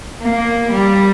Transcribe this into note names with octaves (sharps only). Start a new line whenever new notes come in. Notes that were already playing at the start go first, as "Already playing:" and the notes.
A#3
G3